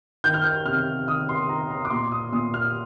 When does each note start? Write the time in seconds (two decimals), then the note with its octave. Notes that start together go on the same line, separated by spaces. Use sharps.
0.24 D#3 G6
0.34 F6
0.44 G6
0.65 C3 F6
1.08 D#3 D#6
1.29 C6
1.49 D#3 A#5
1.71 A#5
1.85 D6
1.91 A#2 C6
2.12 D#6
2.32 A#2 D#6
2.54 F6